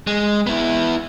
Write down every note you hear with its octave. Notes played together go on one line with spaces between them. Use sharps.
G#3
B3 E4